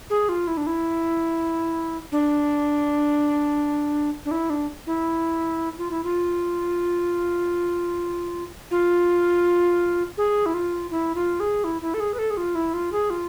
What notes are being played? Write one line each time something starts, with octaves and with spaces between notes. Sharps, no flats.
G#4
F4
E4
D4
E4
D4
D4
E4
D4
E4
F4
E4
F4
F4
G#4
E4
F4
E4
F4
G#4
E4
E4
A4
G#4
B4
A4
G#4
F4
E4
F4
G#4
F4